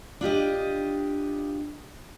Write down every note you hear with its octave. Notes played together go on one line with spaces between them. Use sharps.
D4 F4 G4 D#5